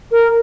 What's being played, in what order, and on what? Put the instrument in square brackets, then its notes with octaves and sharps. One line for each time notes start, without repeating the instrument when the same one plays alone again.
[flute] A#4